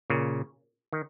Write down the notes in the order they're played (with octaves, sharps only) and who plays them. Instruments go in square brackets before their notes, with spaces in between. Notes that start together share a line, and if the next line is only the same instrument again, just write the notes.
[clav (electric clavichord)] A#2 C#3
D#3